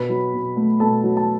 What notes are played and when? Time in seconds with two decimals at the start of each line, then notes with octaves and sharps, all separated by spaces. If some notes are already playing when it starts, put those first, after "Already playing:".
Already playing: B2 B4 B5
0.09 F#3
0.34 B2
0.56 A3
0.80 B2 A4 A5
1.04 F#3
1.17 A5